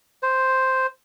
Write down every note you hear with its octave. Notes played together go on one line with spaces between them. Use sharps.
C5